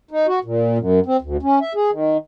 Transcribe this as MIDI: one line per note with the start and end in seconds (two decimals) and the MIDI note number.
0.11 0.27 63
0.27 0.39 66
0.44 0.78 46
0.78 1.00 42
1.06 1.17 60
1.21 1.37 38
1.42 1.59 61
1.61 1.73 76
1.75 1.91 68
1.91 2.17 51